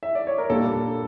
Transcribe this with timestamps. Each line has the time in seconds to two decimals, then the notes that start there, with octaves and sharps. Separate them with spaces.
0.03 E5
0.15 D5
0.27 C#5
0.38 A#4
0.50 A#2 G3 A#3 D4 A4